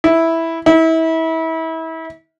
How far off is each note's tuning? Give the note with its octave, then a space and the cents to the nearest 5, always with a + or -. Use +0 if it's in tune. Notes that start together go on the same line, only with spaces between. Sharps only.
E4 -5
E4 -30